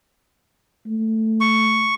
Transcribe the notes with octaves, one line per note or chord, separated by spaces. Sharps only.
A3
C#6